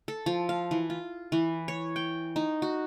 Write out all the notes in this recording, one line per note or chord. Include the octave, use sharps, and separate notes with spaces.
A4
F3
F5
E3
F4
E3
C#5
G5
D#4
F#4